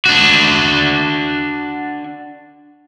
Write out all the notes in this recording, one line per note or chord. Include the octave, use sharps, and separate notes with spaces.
D4 F#4